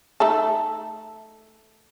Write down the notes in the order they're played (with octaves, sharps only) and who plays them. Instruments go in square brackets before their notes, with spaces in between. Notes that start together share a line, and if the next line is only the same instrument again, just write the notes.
[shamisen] A3 D#4 A4